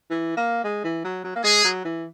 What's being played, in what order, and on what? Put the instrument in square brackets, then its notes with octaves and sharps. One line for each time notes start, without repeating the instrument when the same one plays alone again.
[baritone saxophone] E3
A#3
G#3
E3
F#3
F#3
A#3
[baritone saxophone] G#3 [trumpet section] G#4
[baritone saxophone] F#3
E3